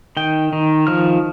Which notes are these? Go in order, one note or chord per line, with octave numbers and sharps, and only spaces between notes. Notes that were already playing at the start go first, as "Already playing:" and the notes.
D#3 G5
D#3
F3 F6